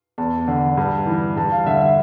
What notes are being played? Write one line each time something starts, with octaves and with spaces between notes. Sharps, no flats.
E2 A5
D3
G2
E3
G2 A5
F5
D3 E5
E5